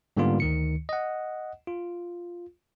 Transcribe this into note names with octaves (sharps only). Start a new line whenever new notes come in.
G#2 D3 G3 A#3 B3 F4
D2 D#3 C#7
D#5 F#5
F4